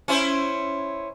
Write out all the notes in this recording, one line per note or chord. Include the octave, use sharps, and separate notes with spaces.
C#4 E4 C5